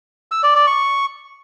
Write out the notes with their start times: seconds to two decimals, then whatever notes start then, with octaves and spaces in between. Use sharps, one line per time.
0.32 E6
0.43 D5
0.55 D5
0.67 C#6